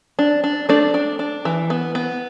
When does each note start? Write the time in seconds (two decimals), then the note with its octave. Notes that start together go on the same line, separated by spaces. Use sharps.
0.19 D4
0.44 D4
0.69 A3 D4 D5
0.94 D4
1.19 D4
1.45 E3
1.70 B3
1.95 B3